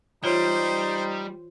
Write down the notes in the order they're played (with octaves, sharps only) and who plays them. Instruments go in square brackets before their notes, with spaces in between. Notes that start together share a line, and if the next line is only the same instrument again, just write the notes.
[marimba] E3 F4 C#5 [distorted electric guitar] G3 [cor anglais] D#4 [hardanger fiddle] C5